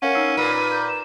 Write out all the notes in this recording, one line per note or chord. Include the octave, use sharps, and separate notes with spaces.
C#4 A#4 F5 F#5 D#7
D#4 E6 C7
A#2 B4
G6
E7